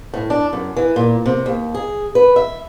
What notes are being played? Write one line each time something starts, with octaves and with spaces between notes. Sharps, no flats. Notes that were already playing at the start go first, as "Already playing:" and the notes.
A2
D4
F#2
E3
A#2
C3
D#2
G#4
B4
E5